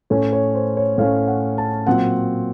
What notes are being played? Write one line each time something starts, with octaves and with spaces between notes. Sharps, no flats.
A2 A3 C#4 C#5
C#5
C5
C#5
A2 A3 C#4 F5
F#5
A5
A#2 F#3 C4 F#5